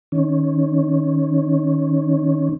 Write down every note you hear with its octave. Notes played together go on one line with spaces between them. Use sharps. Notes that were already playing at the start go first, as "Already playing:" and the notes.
D#3 C#4